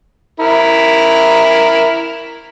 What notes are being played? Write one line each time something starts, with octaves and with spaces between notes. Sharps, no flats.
E4 A#4